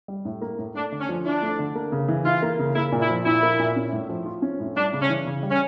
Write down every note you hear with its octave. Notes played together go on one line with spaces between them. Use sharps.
G3
A2
A#3
A2
A3 D4
D3
C#4
F3
D4 E4
A3
D3
A#3
C#3
E3
E4 F4
A#3
C#3
A#3 E4
A#2
E4
F3
A#2 E4
A#3
A#2
C#4
A2
F3
F4
C#4
A2
G3 D4
C#3
C#4
E3
C#3
G3
C#4